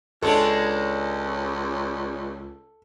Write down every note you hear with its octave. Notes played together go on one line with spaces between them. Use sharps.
C#2 G#3 C#4 D4 A4